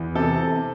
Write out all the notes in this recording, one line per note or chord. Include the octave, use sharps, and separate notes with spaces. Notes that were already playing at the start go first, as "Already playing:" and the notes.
Already playing: E2
C3 A4